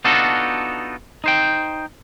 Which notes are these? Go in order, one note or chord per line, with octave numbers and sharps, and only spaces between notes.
B3 D4 D#4 F4 F#4 A4
D#4 C5 G5